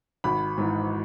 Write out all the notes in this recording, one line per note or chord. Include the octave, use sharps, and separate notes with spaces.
G#1 B5
G#2 E3